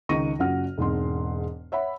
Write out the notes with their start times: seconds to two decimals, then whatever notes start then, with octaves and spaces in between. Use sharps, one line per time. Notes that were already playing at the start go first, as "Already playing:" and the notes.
0.09 C#2 D#3 D#4 C#6 A#6 D#7
0.39 F#1 C#4 F4 F#4 F#5 F6
0.78 E1 G#2 C4 C6
1.72 C#5 E5 F#5 B5